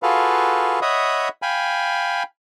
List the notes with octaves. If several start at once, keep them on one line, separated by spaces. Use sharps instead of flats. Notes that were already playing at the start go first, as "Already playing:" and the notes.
F4 F#4 G#4 A4 B4 F5
C#5 D#5 E5 F#5 B5 D#6
F5 G5 G#5 B5